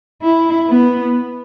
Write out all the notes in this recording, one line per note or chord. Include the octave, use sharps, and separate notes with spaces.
E4
B3